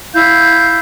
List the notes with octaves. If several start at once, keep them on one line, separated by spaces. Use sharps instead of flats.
E4 F5 G6